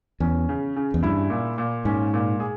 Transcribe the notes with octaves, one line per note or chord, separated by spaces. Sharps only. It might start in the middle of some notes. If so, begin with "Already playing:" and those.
E2 C#4
C#3
C#3
E2
G2 E4
A#2
A#2
G#2 C#4
A#2
G#4